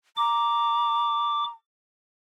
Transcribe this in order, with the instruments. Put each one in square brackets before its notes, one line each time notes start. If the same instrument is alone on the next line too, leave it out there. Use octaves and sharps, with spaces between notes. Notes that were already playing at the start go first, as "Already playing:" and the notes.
[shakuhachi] A#5 [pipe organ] D6